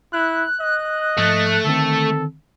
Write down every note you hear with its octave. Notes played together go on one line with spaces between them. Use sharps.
E4 F#6
D#5
G#2 F3 A3 A6
D3 D#3 C4 A4